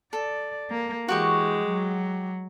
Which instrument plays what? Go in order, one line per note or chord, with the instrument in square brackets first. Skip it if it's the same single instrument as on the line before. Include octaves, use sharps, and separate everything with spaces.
[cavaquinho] A4 [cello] D5
[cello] A#3
[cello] E3 [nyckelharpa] G#3 [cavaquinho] F#4 G4 C#6
[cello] F#3